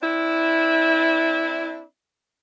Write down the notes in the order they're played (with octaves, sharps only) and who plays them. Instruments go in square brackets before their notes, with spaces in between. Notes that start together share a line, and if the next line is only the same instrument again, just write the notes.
[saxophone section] C4 D4 E4